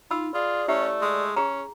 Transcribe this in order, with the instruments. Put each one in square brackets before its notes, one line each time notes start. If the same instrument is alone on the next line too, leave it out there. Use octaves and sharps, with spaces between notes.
[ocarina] D#4 [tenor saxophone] F4 [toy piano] B5 E6
[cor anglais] F4 [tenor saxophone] G#4 [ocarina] D5
[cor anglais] A3 [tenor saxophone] C#4 [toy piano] E4 G4 E5
[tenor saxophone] G#3
[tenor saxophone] C#4 [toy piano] G#4 A#5